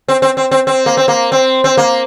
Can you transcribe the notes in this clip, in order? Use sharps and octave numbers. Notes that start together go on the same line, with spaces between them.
C4
C4
C4
C4
C4
A#3
C4
A#3
C4
C4
A#3